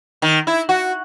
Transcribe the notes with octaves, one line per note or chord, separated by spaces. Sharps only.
D#3
E4
F#4